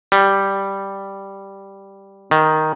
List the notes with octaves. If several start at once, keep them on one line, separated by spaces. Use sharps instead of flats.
G3
D#3